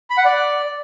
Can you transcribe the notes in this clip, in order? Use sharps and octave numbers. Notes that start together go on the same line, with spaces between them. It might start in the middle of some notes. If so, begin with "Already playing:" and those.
B5
F#5
D5